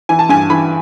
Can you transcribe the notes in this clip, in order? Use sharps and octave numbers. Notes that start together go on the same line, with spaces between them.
E3 G#5
A5
G2 G#5
E3 B5